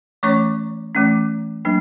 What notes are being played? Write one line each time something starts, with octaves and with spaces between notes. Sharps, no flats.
E3 A3 C#4 C#5 C#6
E3 A3 C#4
F#3 A#3 D4